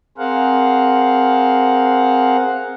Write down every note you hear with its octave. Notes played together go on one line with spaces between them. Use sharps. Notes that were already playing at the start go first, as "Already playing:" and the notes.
C4 G#4 A#4 C5 F5 F#5